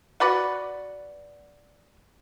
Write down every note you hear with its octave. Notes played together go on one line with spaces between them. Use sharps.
F#4 B4 D5 F#5